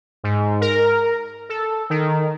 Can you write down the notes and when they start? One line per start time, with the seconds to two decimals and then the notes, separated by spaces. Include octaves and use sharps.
0.24 G#2
0.61 A#4
1.49 A4
1.90 D#3